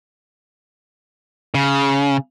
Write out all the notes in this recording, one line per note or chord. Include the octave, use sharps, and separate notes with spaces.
C#3